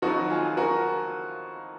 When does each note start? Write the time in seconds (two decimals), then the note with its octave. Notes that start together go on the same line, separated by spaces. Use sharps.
0.02 F2 D#3 F#3 D#4 F#4
0.30 F4 G#4
0.57 F#4 A#4